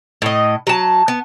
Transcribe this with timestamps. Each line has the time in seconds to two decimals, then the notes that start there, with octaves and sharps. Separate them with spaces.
0.22 A2 D#5
0.67 F#3 A5
1.08 B3